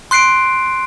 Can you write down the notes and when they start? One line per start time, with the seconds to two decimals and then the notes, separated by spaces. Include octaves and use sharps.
0.11 C6 F#6 C7 D7